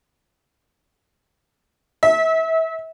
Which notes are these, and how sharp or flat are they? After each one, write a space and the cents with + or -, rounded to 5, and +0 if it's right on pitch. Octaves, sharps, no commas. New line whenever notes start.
E5 -30